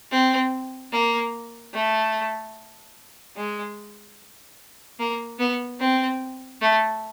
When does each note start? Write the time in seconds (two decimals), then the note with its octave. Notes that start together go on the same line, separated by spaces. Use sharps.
0.11 C4
0.92 A#3
1.74 A3
3.36 G#3
4.99 A#3
5.39 B3
5.80 C4
6.61 A3